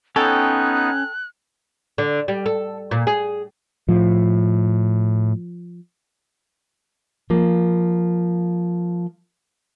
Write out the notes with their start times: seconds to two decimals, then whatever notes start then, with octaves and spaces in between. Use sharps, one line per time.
0.16 B3 C#4 D#4 A4 C#5 G5 F#6
1.98 D3
2.28 G3
2.46 A4
2.91 A#2
3.07 G#4
3.89 A2 F3
7.30 F3 A#3